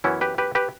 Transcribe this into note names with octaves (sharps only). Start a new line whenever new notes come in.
F#2 E3 B3 C#4 E4
G4 B4
G4 B4
G4 B4